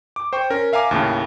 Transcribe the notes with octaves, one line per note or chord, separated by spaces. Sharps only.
D6
C5 G5 C#6
C#4 A#4
E5 F5 G#5 A#5 D6 F6
D#2 A2 C#3